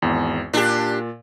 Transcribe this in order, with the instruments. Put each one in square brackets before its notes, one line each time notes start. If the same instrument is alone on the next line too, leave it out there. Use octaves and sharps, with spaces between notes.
[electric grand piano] G#1 E2
[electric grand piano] A#2 [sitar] D4 G4